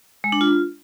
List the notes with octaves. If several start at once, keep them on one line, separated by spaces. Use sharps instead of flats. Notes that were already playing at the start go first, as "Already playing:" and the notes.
G#3
D4
F4